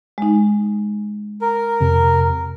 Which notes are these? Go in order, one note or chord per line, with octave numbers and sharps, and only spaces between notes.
G#3 D#4
A#4
F2 C3